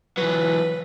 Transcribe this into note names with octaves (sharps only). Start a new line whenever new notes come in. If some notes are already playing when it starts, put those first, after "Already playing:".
E3 F#3 B4